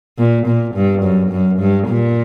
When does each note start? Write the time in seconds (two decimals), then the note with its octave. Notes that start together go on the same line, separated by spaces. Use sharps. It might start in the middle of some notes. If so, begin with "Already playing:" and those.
0.18 A#2
0.47 A#2
0.75 G2
1.03 F#2
1.31 F#2
1.59 G2
1.88 A#2